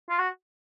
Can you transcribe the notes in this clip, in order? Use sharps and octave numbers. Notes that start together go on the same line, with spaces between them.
F4
F#4